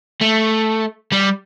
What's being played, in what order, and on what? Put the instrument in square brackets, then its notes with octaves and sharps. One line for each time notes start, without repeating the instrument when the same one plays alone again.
[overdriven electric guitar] A3
G3